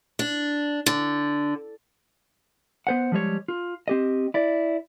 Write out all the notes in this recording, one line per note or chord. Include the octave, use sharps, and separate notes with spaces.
D4
D3
B3 C5 F#5
F3 G3 G#3 C#5
F4
C4 G4 D#5
E4 D5